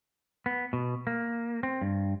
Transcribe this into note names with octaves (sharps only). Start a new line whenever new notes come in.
B3
B2
A#3
C4
G2